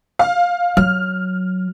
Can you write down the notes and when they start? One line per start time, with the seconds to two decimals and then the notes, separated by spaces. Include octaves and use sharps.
0.19 F5
0.77 F#3 F6